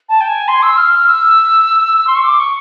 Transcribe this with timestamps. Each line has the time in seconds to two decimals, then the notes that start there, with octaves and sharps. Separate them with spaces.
0.09 A5
0.21 G5
0.28 G#5
0.48 C6
0.63 E6
0.77 F6
0.92 F6
1.07 E6
2.07 C6
2.16 C#6
2.24 D6
2.40 C#6